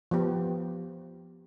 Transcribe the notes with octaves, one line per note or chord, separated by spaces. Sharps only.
F3 B3 G4